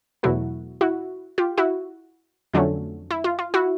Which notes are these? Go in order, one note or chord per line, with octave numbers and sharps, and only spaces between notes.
E2 B2 F#3 A3 E4 F#4
E4 F#4
F4 G4
E4 F#4
F2 D3 F#3 A3 C#4
E4
F4
F4
E4 F#4